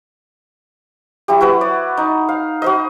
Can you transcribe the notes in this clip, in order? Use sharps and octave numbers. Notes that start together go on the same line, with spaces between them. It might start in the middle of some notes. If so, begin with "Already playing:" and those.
F#3 E4 G4
E4 F#4 B4
D5
D#4
F5
F#4 C5 D#5